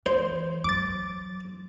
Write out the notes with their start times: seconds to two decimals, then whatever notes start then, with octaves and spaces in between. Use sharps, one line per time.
0.06 E3 C5
0.64 F#3 D6 A6